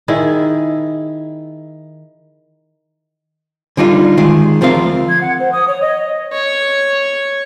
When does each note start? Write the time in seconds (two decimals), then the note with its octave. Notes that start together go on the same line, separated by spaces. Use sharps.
0.08 D#3 E4 G#4
3.77 D3 G3 D#4 F4
4.17 D#3 G#3
4.61 D2 F3 C4 A#4 F5
5.09 G#6
5.21 F#5
5.40 C5
5.53 D#6
5.68 C#5
5.81 D#5
6.33 C#5